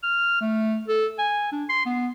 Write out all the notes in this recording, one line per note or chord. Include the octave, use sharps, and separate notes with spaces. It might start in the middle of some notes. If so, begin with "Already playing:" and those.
F6
A3
A4
G#5
D4
C6
B3